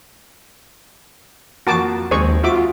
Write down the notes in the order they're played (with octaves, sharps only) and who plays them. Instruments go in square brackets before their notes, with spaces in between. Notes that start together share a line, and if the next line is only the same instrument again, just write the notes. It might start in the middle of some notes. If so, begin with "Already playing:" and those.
[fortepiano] F2 A#3 [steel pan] F#4 A5 D6
[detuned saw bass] D#2 [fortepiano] G#3 C4 [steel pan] G#4 C#6
[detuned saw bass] F4 [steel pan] F#4 E5 D6